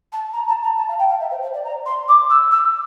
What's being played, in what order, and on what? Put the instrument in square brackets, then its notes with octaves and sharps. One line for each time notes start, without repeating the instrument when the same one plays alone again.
[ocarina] A5
A#5
A5
A#5
A5
F5
G5
F5
E5
C5
C5
D5
A#5
C6
D6
E6
E6